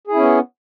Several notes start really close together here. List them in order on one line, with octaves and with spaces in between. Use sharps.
G#4 E4 C#4 B3